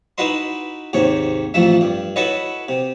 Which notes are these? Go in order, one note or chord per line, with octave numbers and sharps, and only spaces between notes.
D#4 E4 F#4 B4 D#5 C6
D#2 G#2 C3 C#5
A1 F2 F3 A3 E5
G2
E4 F#4 A4 B4 C#5 D#5
C3